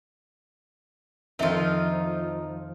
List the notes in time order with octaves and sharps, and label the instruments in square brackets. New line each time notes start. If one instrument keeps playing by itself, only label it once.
[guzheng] F2 D#3 F3 [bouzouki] D#4 F4 [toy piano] A#4 E5